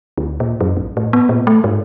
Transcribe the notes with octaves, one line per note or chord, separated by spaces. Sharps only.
D2
A#2
F#2
A#1
A2
B3
A#2
A3
G#2